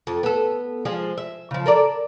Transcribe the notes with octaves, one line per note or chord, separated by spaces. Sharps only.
F2
B3 A4
F3 G#3 G#4
E5
C#3 F3
A4 A#4 D5